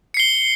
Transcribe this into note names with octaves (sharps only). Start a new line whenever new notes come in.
C7 C#7 G7